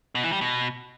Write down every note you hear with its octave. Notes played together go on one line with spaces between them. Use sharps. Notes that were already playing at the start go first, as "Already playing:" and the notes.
B2
E3
G3
B2